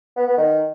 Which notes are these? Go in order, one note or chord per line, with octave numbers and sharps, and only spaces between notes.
B3
B3
D#3